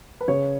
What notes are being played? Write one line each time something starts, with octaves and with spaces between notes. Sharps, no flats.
B4
C#3 C#5